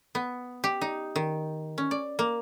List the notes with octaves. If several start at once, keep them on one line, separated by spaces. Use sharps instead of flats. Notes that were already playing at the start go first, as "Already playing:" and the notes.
B3
G4
D#4
D#3
C#4
D5
A#3